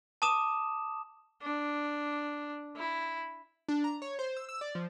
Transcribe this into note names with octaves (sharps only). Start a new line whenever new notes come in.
A5 D6 D#6 E7
D4
E4
D4
A#5
C#5
C5
E6
E6
D5
F3